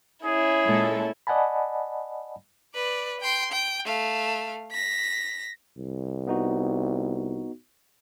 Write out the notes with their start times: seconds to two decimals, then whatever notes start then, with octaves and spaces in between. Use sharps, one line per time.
0.24 C#4 E4 G#4
0.65 A#2 G#3 A4
1.27 D5 D#5 F#5 G#5 A5 B5
2.74 B4 D5
3.20 G5 C6
3.51 G5
3.85 A3 F5
4.71 A#6 B6
5.78 C2
6.27 B3 D#4 F#4